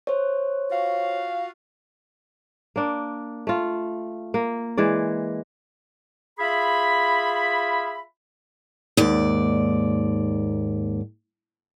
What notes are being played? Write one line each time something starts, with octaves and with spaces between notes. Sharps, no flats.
C5 C#5
F4 F#4 F5
A#3 D4
A3 F4
A#3
E3 G#3 D5
F4 G#4 E5 B5
D#2 G#2 D5